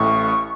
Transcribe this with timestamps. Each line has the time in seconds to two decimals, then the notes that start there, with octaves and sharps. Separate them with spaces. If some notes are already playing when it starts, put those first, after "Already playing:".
Already playing: A1 A2 C#6